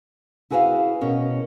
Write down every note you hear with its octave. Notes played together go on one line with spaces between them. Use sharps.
E4 F#4 G#4 B4 D#5 F5
B2 C#4 A#4